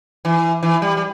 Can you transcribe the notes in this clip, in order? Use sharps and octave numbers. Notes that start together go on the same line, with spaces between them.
E3
E3
G3
G3